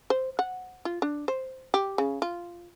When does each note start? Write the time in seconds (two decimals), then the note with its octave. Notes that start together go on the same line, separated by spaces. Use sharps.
0.10 C5
0.39 F#5
0.85 F4
1.02 D4
1.28 C5
1.74 G4
1.98 C#3
2.22 F4